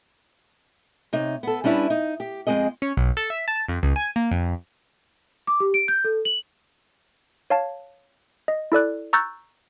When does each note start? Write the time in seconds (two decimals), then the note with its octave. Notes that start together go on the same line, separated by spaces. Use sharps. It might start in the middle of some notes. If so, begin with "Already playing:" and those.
1.13 C3 D#4 C#5
1.43 B3 A4
1.64 G3 C#4 D4 E4 B4
1.90 D#4
2.20 G4
2.47 F2 G#3 C4 G#4 D#5
2.82 C#4
2.97 B1
3.17 A4
3.30 E5
3.48 A5
3.68 F2
3.83 C#2
3.96 G#5
4.16 A#3
4.31 F2
5.47 D6
5.60 G4
5.74 D7
5.88 G6
6.04 A4
6.25 F#7
7.50 C#5 F5 A5
8.48 D#5
8.72 E4 A4 D5 F#6
9.13 A#5 C#6 E6 F#6 G6 A6